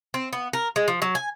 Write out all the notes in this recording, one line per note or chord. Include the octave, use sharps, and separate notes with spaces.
C4
B3
A#4
G#3
F3
F#3
G#5